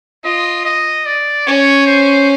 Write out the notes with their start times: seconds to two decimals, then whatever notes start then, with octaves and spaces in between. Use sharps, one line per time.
0.24 F4 D#5
0.65 D#5
1.06 D5
1.47 C#4 C#5
1.87 C5